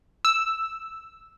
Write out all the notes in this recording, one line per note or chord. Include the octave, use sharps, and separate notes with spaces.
E6